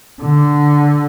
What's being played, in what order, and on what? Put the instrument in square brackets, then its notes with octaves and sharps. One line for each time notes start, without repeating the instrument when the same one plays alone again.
[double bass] D3